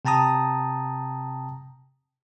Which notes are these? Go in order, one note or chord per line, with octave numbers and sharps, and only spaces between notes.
C3 G5 A5 A#5 D#6